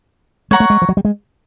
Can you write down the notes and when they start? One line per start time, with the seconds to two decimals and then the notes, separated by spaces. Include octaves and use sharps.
0.51 G#3 C#5 F#5 A#5 C#6
0.60 A3
0.70 G#3
0.82 F3
0.89 F#3
0.97 G3
1.05 G#3